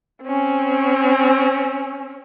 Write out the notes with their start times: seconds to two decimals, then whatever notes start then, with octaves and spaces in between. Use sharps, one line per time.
0.23 C4 C#4